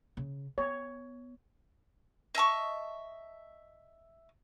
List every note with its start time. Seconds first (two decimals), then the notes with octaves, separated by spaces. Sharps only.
0.17 C#3
0.58 B3 C#5
2.35 D#5 E5 A5 C#6